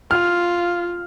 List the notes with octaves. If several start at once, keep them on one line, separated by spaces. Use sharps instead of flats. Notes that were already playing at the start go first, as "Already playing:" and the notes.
F4 F6